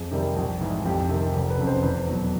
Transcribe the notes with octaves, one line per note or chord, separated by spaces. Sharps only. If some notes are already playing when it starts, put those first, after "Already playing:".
Already playing: F2 G#4
C3 D#3 G3
A#1
G#2 E3
F2 G4
C3 D#3
F1
B4
F2 C#3
C5
E2 B4
B2 F#3